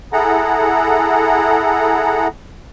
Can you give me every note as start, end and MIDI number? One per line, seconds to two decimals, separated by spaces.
0.13 2.28 64
0.13 2.28 68
0.13 2.28 69
0.13 2.28 78
0.13 2.28 82